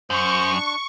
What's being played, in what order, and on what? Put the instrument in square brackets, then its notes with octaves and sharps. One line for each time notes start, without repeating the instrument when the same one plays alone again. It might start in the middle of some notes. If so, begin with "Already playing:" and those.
[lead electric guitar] F#2 [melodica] C5 [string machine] C#6
[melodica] D4